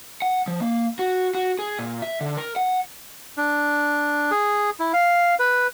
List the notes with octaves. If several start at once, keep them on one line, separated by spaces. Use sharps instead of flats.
F#5
F3
A#3
F#4
F#4
G#4
A#2
E5
D3
A#4
F#5
D4
G#4
E4
F5
B4